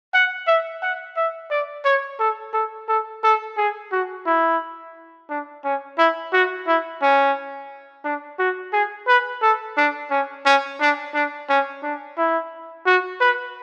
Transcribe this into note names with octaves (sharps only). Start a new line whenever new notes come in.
F#5
E5
F#5
E5
D5
C#5
A4
A4
A4
A4
G#4
F#4
E4
D4
C#4
E4
F#4
E4
C#4
D4
F#4
G#4
B4
A4
D4
C#4
C#4
D4
D4
C#4
D4
E4
F#4
B4